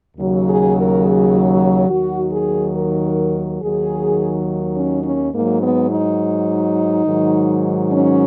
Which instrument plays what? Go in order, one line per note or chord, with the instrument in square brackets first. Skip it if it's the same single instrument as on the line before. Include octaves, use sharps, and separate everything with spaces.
[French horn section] D#2 C#3 F#3
G#4
A#4
G#4
D#2 D#3 F#3 F#4
G#4
A#4
D#2 D#3 F#3 G#4
C#4
C#4
G#2 F#3 A#3
B3
D#4
G#2 D#3 F#3
C#4